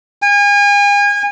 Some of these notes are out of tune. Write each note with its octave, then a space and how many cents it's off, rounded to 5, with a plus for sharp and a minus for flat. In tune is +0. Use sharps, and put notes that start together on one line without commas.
G#5 -35